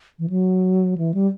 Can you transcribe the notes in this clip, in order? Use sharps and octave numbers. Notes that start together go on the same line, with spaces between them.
E3
F#3
E3
G3